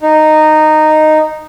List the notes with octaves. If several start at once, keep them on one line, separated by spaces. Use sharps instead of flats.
D#4